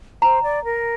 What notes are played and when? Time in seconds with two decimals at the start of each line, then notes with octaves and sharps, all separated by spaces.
0.22 C5 A#5
0.43 D5
0.65 A#4